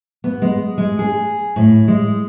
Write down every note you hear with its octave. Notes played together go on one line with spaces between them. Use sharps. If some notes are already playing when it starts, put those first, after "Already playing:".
B3
G#3
G#3
G#4
A2
G#3